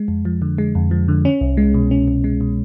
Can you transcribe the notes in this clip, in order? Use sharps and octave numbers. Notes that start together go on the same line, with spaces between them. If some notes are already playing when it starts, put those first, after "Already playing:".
Already playing: G#3
F2
F3
D3
G#3
F2
F3
D3
C#4
C2
G#3
B2
C#4
C2
G#3
B2